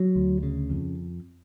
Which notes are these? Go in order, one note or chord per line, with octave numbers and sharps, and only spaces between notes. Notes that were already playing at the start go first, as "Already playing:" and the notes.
Already playing: F#3
D2
C#3
F2